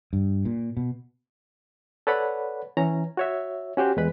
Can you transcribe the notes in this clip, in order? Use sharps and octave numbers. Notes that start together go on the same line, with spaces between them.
G2
A#2
B2
A4 B4 C#5 D5 F#5 B5
E3 C#4 A#5
F#4 C#5 E5
C#4 F#4 G4 C5
E2 G#3 B4 B5